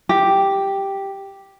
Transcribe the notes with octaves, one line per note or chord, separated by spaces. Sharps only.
G4